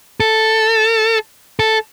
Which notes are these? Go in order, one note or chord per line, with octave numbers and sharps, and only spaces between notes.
A4
A4